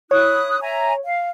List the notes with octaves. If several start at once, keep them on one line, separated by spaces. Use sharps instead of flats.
E4 C#5 D#6 F#6
E5 G#5 A#5
F5